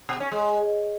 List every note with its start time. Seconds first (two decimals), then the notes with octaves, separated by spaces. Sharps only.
0.09 B2
0.20 C#4
0.32 G#3